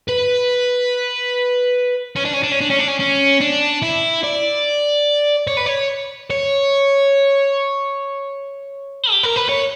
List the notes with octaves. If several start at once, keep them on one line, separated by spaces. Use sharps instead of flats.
B4
C#4
D4
C#4
D4
C#4
D4
C#4
D4
C#4
C#4
D4
E4
D5
C#5
B4
C#5
C#5
G4
A#4
B4
C#5